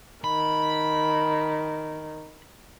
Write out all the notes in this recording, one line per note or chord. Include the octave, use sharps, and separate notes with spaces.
D#3 B5